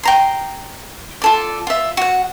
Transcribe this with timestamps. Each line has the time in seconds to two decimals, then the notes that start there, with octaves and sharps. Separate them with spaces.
0.03 G5 A#5 C6
1.22 F4 A4 D5
1.67 F4 E5
1.97 F#4 F#5